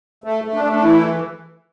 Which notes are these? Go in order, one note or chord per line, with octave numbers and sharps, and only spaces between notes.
A3
A3
D4
A3
D4
E3 E4